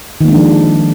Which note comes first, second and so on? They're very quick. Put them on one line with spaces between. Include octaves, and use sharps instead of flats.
D#3 A#3 G#3 D4 F3